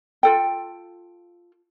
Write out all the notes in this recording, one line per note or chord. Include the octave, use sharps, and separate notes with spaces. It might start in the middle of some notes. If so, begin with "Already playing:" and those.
F4 A4 G5